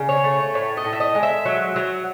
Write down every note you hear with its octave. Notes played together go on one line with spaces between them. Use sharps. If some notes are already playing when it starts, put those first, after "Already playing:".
Already playing: C#3
C#5
A3
A2 C#5
D#5
A2
E5
D#5
G#3
E5
F#3
F#3